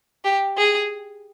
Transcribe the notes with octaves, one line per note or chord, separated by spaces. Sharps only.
G4
G#4